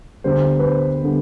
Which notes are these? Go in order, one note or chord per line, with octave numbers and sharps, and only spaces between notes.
D2 D3 G3 B3 C5
B4
C5
D3 G3 B3